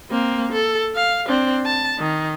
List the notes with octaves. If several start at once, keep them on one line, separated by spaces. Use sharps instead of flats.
A#3 C4
A4
F5
C4 D4
A5
D#3